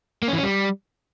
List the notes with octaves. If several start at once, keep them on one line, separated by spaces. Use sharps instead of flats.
A#3
C#4
E3
C#4
G3